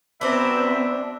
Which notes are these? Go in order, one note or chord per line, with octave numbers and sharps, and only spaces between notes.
F#3 B3 C4 D4 B4 C5 E5